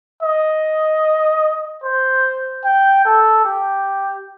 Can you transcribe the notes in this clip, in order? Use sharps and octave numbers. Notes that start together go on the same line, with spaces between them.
D#5
C5
G5
A4
G4